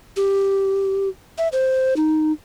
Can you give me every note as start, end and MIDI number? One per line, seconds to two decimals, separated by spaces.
0.16 1.09 67
1.38 1.48 76
1.52 1.94 72
1.96 2.32 63